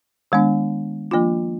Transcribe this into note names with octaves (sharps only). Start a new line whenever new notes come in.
D#3 G#3 B3 D4
F3 A#3 D4 F4